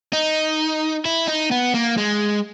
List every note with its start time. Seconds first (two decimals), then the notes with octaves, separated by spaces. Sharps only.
0.13 D#4
1.05 E4
1.28 D#4
1.52 B3
1.75 A#3
1.98 G#3